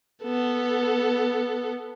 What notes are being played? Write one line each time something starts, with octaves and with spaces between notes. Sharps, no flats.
B3 A4